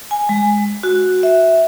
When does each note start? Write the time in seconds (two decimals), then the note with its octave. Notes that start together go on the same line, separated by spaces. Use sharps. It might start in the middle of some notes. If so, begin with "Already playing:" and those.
0.11 G#5
0.29 G#3
0.83 F#4
1.23 E5